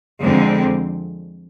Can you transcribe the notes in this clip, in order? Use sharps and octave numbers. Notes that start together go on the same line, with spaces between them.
F2 D3 G#3 C4